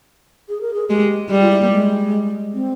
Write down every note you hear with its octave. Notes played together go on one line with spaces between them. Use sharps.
G#4
A#4
G#4
G#3 G4
G3 G4
F4
E4
A#3
G#3
C4